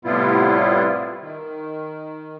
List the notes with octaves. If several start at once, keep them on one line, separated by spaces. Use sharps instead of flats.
A2 C3 G3 B3 E4 F4
D#3